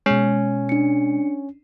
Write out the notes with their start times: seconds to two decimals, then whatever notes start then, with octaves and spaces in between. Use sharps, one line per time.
0.06 B2 G#3 C#4
0.69 D4 C#7